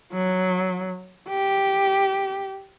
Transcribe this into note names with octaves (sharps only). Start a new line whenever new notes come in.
F#3
G4